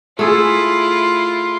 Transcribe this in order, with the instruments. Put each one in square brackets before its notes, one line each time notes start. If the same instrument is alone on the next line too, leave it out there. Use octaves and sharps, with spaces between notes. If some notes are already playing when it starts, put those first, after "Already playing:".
[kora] A3 G#4 A4 [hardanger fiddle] E4 F4